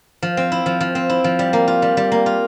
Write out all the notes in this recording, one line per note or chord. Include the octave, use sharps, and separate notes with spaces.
F3
C4
E4
F3
F3
C4
E4
F3
G3
A#3
F4
G3
G3
A#3
F4